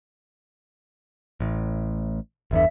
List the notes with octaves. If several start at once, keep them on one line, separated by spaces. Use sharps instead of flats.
A1 A2
G1 E2 D3 E5